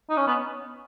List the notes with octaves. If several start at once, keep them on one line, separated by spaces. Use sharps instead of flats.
D#4
C#4
B3